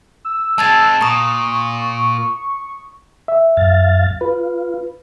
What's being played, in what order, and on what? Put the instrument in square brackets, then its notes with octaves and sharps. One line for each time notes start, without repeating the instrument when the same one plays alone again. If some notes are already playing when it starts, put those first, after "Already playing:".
[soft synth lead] E6
[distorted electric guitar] G#3 C4 [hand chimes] A5 G#6 A6
[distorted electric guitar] A#2 [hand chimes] A#5 D#6 [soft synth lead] C#6
[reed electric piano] E5
[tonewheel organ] F#2 F5 A6
[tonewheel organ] F4 [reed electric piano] B4